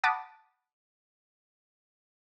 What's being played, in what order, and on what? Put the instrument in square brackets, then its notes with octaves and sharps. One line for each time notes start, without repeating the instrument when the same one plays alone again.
[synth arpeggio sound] F#5 A5 B5 D6 D#6